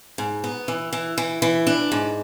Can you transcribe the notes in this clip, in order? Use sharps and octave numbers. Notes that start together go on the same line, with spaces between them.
G#2
B3
E3
E3
E3
E3
D4
G#2